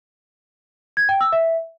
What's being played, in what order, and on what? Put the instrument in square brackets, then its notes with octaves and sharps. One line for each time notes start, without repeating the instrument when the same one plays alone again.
[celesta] G#6
G5
E6
E5